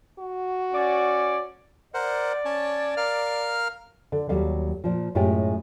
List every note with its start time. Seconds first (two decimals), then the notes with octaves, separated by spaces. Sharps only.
0.19 F#4
0.73 C#4 D5
1.94 A#4 C5 D5 F#5
2.45 C#4 C#5 A5
2.97 A#4 F5 F6
4.12 D3
4.29 D#2 F#3 G3 F5
4.84 A#2 F3
5.15 F#2 A2 G#3 F4 G4 G#4